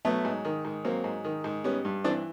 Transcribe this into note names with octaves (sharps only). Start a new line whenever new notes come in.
F#3 A3 B3
G#2
D#3
G#2
F#3 A#3 C4
G#2
D#3
G#2
G3 B3 C#4
G2
E3 C4 D4